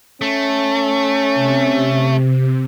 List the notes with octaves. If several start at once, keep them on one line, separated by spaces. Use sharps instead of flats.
A3 C#4
C3